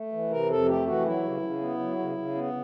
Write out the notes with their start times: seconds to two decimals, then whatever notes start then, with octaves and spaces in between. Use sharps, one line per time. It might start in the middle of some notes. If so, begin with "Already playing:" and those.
Already playing: A3
0.12 E3
0.31 C3 A#4
0.49 F2 A4
0.67 A3 G4
0.86 E3 F#4
1.05 F#3 E4
1.24 C#3
1.42 C#3
1.61 B3
1.79 F#3
1.99 C#3
2.18 C#3
2.35 B3